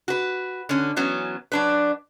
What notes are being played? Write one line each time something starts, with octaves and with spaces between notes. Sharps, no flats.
F#4 B4
D3 C#4
E3 F#3 B3 C#4
F#3 D4 B4